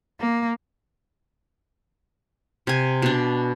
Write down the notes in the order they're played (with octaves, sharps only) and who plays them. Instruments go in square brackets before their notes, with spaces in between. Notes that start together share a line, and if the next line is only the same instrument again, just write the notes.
[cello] A#3
[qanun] C3 G#5
B2 D4